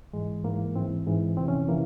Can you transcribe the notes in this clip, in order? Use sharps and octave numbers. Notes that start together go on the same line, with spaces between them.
G#2 E3 G#3
G#2 E3 A#3
G#2 E3 C4
G#2 E3
F2 C3 E3 C4
C#4
C3 E3 A#3